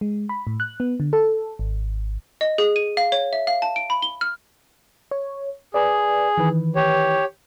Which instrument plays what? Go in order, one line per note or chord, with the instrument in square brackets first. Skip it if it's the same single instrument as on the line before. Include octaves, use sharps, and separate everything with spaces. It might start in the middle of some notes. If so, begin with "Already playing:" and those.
[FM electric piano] G#3
B5
A2
F#6
B3
D3
A4
G#1
[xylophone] D#5
G#4
D#7
F5
C#5
E5
F5
A5
D7
B5
G7
F6
[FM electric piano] C#5
[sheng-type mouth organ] G#4 [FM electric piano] B4 D5
[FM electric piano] D#3 E3 B4
[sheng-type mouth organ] G4 C#5